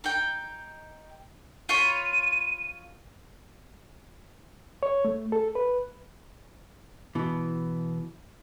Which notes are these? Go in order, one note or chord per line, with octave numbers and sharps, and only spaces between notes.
D#4 G5
F4 C#5 B5 D#7
C#5
A3
A4
B4
B2 E3